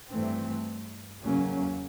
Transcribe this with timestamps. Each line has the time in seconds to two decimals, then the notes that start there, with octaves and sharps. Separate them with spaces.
0.10 G2 E3 A3 C4
1.22 E2 C#3 F#3 A#3 C#4